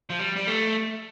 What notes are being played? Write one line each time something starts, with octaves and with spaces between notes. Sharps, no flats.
F3
G3
G3
A3